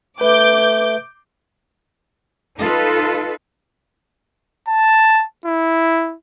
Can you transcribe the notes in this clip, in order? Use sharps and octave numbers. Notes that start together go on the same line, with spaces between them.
A3 B4 D6 G6
D#4 F4 A4 B4
A5
E4